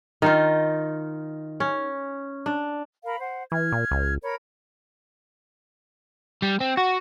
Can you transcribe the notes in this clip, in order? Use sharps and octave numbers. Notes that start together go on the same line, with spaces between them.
D#3 D#4 F4
C#4
D4
A#4 F5 B5
C5 F#5
E3 F6 G#6
A#2
C#2
A#4 C#5 B5
G3
C4
F#4